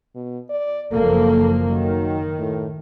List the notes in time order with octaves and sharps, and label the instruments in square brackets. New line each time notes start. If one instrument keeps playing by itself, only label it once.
[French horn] B2
D5
[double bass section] F#1 F3 A#3 [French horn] A4
[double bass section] D#3 [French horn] F#3
[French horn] A2